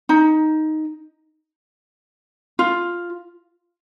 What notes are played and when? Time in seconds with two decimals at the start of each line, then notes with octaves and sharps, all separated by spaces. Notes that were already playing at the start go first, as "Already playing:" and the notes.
0.09 D#4
2.59 F4